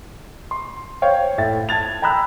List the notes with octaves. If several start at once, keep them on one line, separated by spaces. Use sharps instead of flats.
C6
C5 C#5 F5 G5
A2 E5 G5 A6
A5 G#6 A6 F7
G5 A#5 B5 E6 F#6